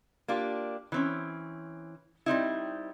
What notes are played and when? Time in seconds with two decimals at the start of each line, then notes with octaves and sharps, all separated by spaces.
0.28 A#3 D4 F4 G4
0.92 E3 C4 C#4
2.26 G3 C4 D#4 E4